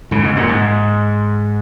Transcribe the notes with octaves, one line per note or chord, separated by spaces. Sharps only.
G#2 C#3
G#2
F#2 A#2
G#2